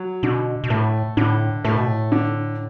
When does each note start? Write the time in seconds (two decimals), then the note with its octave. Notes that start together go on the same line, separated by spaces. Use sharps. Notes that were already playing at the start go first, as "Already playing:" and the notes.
Already playing: F#3
0.23 B2 D3
0.64 B2
0.70 A2 A3
1.17 A2 D3
1.65 A2 A3
1.77 B2
1.88 A2
2.12 D3